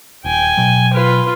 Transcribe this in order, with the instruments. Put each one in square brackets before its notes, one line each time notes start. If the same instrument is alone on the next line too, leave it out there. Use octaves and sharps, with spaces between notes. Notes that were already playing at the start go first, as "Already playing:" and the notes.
[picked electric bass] D#1 [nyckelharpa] G5 G#5
[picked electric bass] B2 F#3
[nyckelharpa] F4 B4